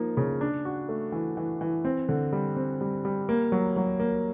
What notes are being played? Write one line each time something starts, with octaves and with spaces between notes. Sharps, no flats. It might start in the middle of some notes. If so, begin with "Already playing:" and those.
Already playing: F3 A#3 D#4
C#3
D4
F#4
A3
E3
E3
E3
C4
D3
G3
C4
G3
G3
A#3
F#3
F#3
A#3